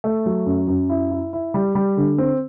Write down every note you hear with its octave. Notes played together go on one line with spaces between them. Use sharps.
A3
F#3
F#2
F#2
E4
E4
E4
G3
G3
D3
C4